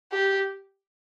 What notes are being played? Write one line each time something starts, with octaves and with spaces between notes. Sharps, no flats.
G4